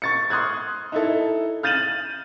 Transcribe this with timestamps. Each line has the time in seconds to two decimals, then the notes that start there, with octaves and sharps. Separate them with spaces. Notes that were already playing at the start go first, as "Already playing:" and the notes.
0.02 C#6 A6 C#7
0.30 C6 D#6 F6 F#6 G#6
0.92 D#4 E4 A4
1.63 F6 G6 A6 D#7 E7 F#7